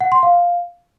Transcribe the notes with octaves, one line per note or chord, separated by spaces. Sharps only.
F#5
C6
F5